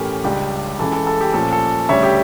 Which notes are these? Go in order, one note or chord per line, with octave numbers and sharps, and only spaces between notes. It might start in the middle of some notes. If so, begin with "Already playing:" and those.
Already playing: A2 E3 A3 C#4 G4 A#4
C#2 C#3 G3 D4 G4
C#2 C#3 E3 A4
A4
A4
G4
A#2 F3 A3 C#4 A4
A4
D2 C#3 G3 C#5 E5
G4